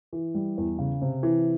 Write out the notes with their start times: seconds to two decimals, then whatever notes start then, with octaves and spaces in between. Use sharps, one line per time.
0.13 E3
0.34 G3
0.58 E2
0.79 C#3
1.02 C3
1.23 E3